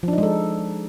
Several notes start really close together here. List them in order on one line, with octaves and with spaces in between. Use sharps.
F3 D4 D#4 G#3 A4